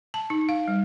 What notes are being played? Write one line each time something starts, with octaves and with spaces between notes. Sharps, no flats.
A5
D#4
F5
G3